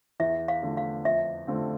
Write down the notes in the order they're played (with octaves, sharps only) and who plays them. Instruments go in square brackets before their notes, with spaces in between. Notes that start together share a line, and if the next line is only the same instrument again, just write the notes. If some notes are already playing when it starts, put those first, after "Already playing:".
[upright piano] E2 [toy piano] E5
[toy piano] F5
[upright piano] D3 F3 A3
[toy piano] F5
[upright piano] F2 [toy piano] E5
[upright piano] D3 A3 C4 F4